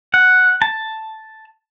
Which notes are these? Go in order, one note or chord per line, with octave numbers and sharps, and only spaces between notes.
F#5
A5